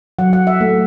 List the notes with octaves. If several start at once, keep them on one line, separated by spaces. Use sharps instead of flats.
F#3 F#5
F#5
E5
A3